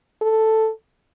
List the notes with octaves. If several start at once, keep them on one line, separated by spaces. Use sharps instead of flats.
A4